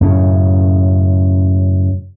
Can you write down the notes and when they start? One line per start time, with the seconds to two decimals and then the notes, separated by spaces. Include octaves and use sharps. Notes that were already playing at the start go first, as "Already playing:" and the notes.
0.01 F#2 A2 C#3